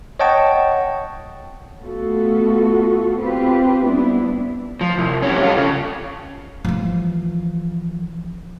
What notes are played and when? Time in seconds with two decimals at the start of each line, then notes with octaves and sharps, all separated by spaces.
0.20 C#5 D#5 F#5 G5 A5 C#6
1.80 A3 B3 F4 F#4 A4
3.18 C4 F4 G4 B4
3.84 G3 B3 D4 E4
4.81 F3
4.98 C2
5.22 G3 C#4
5.43 F4 A4
5.57 C#3
6.65 E3 F3